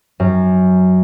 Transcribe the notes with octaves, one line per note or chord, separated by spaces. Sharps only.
F#2